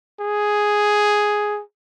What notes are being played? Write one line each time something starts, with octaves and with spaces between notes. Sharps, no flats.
G#4